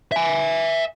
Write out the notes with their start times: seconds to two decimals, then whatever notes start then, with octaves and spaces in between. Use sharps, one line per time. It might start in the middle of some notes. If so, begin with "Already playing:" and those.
0.12 E5 G#5